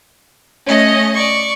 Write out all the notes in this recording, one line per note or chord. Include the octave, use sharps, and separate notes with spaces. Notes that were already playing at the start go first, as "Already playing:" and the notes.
A3 C#4 D#5
D5 C#6